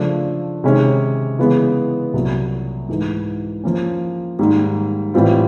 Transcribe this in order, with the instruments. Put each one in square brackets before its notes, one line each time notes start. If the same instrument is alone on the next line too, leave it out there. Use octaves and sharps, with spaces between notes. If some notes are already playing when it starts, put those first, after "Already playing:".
Already playing: [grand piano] C#3 F3 A3 D4
C3 D#3 G#3 C#4
C#3 E3 G#3 B3
C2 A#2 F#3
G#2 E3 A3
F3 A#3 C#4
G#2 D#3 G3 A#3
A2 E3 G3 C4 F4